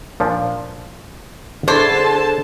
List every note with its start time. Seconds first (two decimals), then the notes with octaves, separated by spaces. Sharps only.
0.20 A#2 F3 D4
1.68 D3 D4 E4 G#4 A4 C5 A5